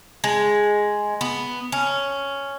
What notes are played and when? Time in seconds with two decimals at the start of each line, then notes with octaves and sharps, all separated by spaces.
0.24 G#3
1.21 B3
1.72 C#4